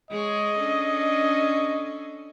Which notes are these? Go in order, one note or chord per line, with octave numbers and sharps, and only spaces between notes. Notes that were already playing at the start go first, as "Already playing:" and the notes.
G#3 G#4 C#5 D#5
C#4 D4 A4